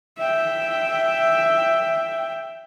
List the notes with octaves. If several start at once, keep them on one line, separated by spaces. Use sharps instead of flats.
E5 G5